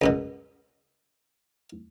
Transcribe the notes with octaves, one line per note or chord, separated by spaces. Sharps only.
C#2 F#2 B2